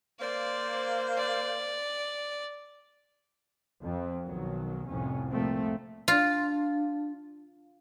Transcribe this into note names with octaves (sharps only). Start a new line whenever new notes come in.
A#3 C5 D5
D5
F2
B1 D#3 F#3
F1 C2 F2 A2 C3 C#4
C2 A#2 F3 A3 A#3 C4
D4 F4